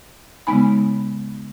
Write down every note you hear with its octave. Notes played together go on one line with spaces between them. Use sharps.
C#3 G#3 B3 D#4 G#5 B5